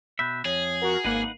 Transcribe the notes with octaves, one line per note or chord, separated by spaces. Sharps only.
B2 E5 B5 F#6 G6
F2 G#4 C#5
F#4 A#4 F#5
G#1 A#3 D#4 B4 F#5 C7 D#7